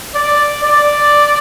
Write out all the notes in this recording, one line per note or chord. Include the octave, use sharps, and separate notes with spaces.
D5
D5